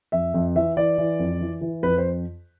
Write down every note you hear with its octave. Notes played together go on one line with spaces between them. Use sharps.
F2 E5
F2
E3 E5
E3 D5
E3
F2
E3
E3
F2 B4
C5